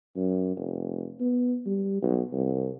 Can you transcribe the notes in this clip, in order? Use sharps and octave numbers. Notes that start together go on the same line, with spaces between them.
F#2
F1
B3
G3
B1
C2